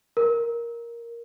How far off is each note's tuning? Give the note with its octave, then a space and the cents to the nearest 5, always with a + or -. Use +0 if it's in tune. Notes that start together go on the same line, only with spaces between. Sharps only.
A#4 +5